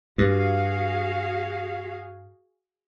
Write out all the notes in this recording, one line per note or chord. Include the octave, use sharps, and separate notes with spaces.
G2 F#4 G#4 F5